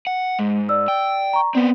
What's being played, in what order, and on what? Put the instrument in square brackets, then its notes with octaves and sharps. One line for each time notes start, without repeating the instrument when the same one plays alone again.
[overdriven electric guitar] F#5
[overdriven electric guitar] G#2 [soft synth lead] G#3
[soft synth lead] D5 [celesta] E6
[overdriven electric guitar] G5
[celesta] A#5 C#6
[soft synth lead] B3 [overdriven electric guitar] C4 B4 [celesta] D5